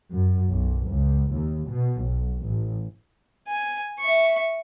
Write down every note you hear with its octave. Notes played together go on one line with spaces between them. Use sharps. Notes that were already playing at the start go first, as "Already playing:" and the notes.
F#2
B1
C#2
D#2
B2
B1
A1
G#5
E5 C#6